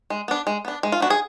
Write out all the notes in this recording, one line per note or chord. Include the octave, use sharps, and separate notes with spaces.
G#3
B3 D4
G#3
B3 D4
G#3
F4
B3 D4 F#4
G#4